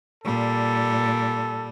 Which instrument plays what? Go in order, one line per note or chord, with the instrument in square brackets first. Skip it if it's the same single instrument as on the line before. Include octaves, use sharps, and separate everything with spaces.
[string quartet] A#2 G3 [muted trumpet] A4